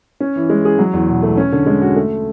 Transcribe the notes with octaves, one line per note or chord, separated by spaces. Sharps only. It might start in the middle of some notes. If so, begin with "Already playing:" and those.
C#4
E3
G#3
G#4
F#3
E2
B2
A3
C#4
D3
G#3
F#4
A3